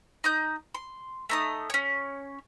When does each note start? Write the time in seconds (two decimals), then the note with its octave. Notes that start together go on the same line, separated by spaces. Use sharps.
0.24 D#4 D#6 G6
0.75 C6
1.29 A3 D#4 D#6
1.70 C#4 C#5